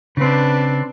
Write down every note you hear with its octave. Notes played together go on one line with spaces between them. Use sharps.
C#3 C4 D4 B4